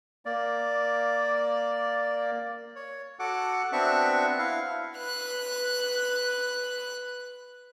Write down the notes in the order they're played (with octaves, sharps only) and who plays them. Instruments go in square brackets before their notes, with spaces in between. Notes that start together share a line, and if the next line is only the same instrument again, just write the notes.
[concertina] A#3 D5
C#5
F#4 A4 F#5 D6
B3 C4 D4 F#4 E5 C#6
E4 F5
[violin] B4 F#6